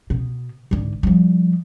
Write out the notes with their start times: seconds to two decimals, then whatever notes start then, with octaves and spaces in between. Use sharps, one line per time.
0.10 B2
0.71 G#1 D3
1.03 F3 G3